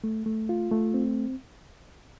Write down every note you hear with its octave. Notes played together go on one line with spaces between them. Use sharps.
A3
A3
F4
A3
C4